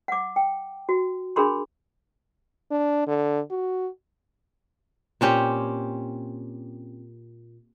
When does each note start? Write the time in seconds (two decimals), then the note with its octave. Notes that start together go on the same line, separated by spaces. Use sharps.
0.08 F#5 D6
0.36 G5
0.89 F#4
1.36 D4 G#4 A#4 B5 C6
2.71 D4
3.07 D3
3.51 F#4
5.21 A#2 C4 C#4 G4